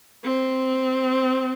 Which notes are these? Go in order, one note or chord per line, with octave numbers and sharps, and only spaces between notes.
C4